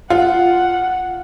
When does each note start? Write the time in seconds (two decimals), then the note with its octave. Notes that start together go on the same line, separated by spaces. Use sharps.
0.10 F4 F#5